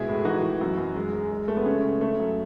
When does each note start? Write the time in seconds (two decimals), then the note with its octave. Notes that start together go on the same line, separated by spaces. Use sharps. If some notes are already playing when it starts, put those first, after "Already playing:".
Already playing: B2 G#3 E4 G#4
0.08 A2
0.25 E3 D#4 F#4
0.42 E3
0.61 F#2
0.77 F#2
0.96 G#3
1.13 G#3
1.31 G#3
1.48 G#3 A3
1.57 B3
1.66 C#3 A3 C#4
1.84 C#3
2.01 C#3 A3
2.20 F#2